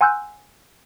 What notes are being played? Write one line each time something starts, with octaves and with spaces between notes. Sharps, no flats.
F#5 G#5 C6 E6 F#6 G6